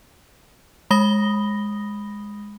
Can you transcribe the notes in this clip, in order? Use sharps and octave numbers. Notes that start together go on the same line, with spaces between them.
G#3 B5 D#6 A#6 G7